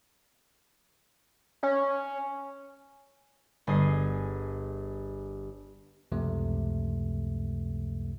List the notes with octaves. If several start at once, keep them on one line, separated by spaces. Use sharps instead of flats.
C#4
G1 G#4 D#5 C7
C#2 F#2 C3 F3 A3